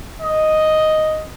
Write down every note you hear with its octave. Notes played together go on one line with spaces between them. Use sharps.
D#5